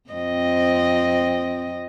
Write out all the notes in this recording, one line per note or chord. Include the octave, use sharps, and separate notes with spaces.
F2 C4 D#5